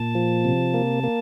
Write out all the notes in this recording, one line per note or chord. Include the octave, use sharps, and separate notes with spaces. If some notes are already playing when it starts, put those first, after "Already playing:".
Already playing: A#2 A5
F3
C3
A#3
A#3